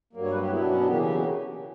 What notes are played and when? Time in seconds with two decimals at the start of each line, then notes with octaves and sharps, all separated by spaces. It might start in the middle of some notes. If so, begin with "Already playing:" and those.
0.13 G2 F#3 A#3
0.23 C#5
0.32 B4
0.41 G4
0.50 B2 F#3 B3 E4
0.60 D4
0.69 C#4
0.79 D4
0.88 C#3 E3 A#3 G4
1.06 G4
1.15 F#4